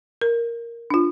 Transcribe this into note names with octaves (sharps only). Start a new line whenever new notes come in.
A#4
D4 F4